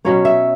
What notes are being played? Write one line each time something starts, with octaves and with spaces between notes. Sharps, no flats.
B2 F#3 C#4 C#5
E5